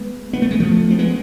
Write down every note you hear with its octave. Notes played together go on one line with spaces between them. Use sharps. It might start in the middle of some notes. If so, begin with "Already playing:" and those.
Already playing: G#3 B3
B3
A3
G#3
F3 A3
C4
G#3 B3